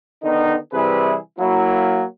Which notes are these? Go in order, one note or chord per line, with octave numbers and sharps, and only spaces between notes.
D3 D#3 B3 D#4
C3 E3 G3 E4 G#4 B4
F#3 A#3 E4